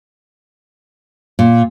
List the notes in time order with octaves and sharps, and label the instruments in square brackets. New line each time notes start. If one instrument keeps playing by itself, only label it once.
[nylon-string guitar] A#2